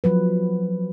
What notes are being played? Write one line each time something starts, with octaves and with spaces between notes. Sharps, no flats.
F3 F#3 B4